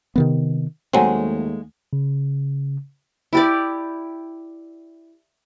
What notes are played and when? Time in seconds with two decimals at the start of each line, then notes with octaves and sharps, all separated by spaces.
0.16 C3 D#3 B3
0.93 D#2 F#3 G#3 A3 C4 F5 F#5 G#5
1.93 C#3
3.33 E4 G4 D5